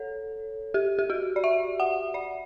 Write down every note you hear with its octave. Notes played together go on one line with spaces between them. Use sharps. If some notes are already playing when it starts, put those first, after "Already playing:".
Already playing: A4 C#5
G4
G4
F#4
D5
E5
F#5
D5